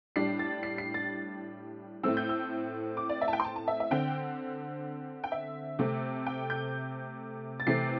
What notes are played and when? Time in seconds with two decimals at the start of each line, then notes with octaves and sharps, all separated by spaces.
0.16 A2 G3 D4 C7
0.39 A6
0.63 C7
0.78 C7
0.94 A6
2.03 A2 A3 C4 E6
2.17 G6
2.29 E6
2.97 D6
3.09 D5
3.21 E5
3.28 A5
3.33 G5
3.40 C6
3.45 A5
3.56 A5
3.68 E5
3.80 E5
3.91 D3 C4 G5
5.24 G5
5.32 E5
5.79 C3 A3 C4
6.26 G5
6.50 G6
7.60 A6
7.67 C3 E3 A3 C4 C7